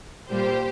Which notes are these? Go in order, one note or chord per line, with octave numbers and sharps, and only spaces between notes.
A#2 G3 A#3 G4 C5